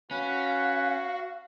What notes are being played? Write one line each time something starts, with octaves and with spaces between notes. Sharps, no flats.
C#4 F#4 B4 F5